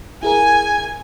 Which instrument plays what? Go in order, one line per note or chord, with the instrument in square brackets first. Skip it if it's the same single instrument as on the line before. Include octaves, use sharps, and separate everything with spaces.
[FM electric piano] E4 G#4 A#4 [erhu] G#5